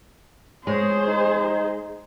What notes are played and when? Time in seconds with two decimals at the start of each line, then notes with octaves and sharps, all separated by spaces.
0.67 G#3 G#4 C5 C#5
1.07 D#4